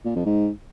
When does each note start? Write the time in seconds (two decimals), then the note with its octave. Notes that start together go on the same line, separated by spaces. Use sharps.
0.05 A#2
0.16 F2
0.26 G#2